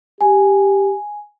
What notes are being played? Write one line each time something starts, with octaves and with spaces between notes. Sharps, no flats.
G4 G#5